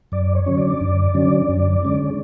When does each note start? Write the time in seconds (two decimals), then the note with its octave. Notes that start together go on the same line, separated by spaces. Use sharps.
0.12 F#2 D5
0.35 C#5
0.46 D3 F#3 C#4
0.58 D5
0.81 F#2
1.15 D3 F#3 C#4
1.49 F#2
1.83 D3 G#3 C#4